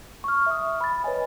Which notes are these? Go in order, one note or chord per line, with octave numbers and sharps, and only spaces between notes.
C#6 F6
E5 D#6
B5 A6
B4 C#5 D#5 G#5